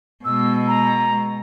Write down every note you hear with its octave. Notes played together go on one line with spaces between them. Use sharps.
B2 G#3 E6
A#5